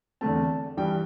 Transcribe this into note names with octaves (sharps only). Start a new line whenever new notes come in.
E2 D3 A3 C4 A5
G2 E3 G3 G5